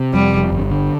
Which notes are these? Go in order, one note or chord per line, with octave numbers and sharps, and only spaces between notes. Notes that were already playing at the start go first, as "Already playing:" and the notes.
Already playing: C3
F2 G3
F1
G1
D3